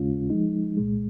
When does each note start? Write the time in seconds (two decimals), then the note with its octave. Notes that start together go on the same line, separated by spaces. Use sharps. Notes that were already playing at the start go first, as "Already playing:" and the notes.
Already playing: D#2 C#3 G#3 C#4 F4
0.30 F3 G#3 D#4
0.77 C2 A#2 G#3